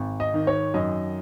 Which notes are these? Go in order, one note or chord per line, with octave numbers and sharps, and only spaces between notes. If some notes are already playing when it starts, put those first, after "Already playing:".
Already playing: G#1
D#5
D#3
C#5
F#2 D#5